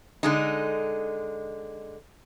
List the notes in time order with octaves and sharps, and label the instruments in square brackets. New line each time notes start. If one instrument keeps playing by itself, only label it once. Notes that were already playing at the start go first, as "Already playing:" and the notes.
[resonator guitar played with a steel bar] D3 G#3 D#4